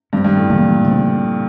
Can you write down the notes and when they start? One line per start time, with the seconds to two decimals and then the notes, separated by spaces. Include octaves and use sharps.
0.13 G2 D#3 G3 C4
0.25 G2
0.37 A2
0.49 A#2 C#3 E3 G#3
0.84 C#3 F3 A3 C4